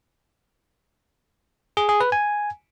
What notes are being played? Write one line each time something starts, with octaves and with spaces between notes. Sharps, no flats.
G#4
G#4
B4
G#5